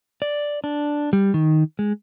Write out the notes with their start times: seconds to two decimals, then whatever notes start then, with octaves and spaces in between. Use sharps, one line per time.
0.22 D5
0.64 D4
1.13 G3
1.34 D#3
1.79 G#3